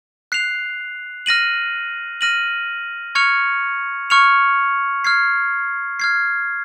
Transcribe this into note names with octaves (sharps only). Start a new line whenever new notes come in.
F#6 C7 F7
F6 A#6 D#7 F#7
F6 A#6 D#7 F#7
C#6 F6 G#6 C#7 F7
C#6 F6 G#6 C#7 F7
F6 G#6 C7
F6 G#6 C7